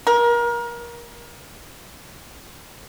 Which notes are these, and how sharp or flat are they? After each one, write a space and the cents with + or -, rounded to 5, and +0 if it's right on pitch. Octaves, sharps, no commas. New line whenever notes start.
A#4 +30